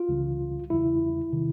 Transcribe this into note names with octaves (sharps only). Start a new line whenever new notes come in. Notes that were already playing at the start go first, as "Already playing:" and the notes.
Already playing: F4
C#2 C#3 E3 G3
E2 C#3 E3 G3 E4
C3 D#3